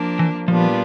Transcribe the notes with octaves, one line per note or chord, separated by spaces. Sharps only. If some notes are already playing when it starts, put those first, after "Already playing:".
Already playing: F3 A#3 D4
E3
A#2 F3 G3 B3 D4 F4